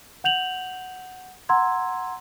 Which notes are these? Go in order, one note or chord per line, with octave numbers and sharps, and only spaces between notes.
F#5 G6 F7 F#7
F#5 A#5 C6 E6 G#6